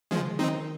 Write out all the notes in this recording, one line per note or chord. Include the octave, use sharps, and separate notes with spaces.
D#3 F3 G#3
C#3
D#3
D#3 C4 D#4